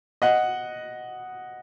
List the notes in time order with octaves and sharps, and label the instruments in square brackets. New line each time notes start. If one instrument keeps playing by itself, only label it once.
[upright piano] D#5 F#5